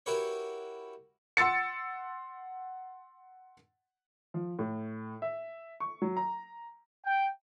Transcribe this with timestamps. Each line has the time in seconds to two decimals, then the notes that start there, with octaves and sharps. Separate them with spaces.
0.06 E4 F#4 G4 A#4 B4 C#5
1.37 F#5 C6 E6 A6 C#7
4.34 F3
4.59 A2
5.22 E5
5.80 C#6
6.02 F#3
6.17 A#5
7.05 G5